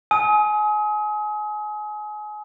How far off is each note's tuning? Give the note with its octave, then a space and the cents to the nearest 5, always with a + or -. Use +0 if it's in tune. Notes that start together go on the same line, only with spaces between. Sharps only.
G#5 +30 D#6 +35